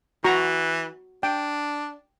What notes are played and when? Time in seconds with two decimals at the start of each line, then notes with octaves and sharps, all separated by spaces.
0.24 E3 F#4 A#5 C#6
1.23 D4 G5